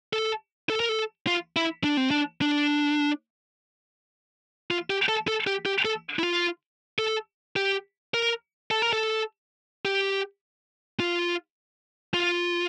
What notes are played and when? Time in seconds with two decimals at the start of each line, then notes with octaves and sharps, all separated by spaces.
0.13 A4
0.70 A4
0.80 A#4
0.89 A4
1.27 F4
1.56 E4
1.84 D4
1.97 C4
2.11 D4
2.42 D4
4.71 F4
4.90 G4
5.09 A4
5.28 A4
5.47 G4
5.66 G4
5.85 A4
6.19 E4
6.23 F4
6.99 A4
7.56 G4
8.14 A#4
8.71 A4
8.82 A#4
8.93 A4
9.85 G4
11.00 F4
12.14 F4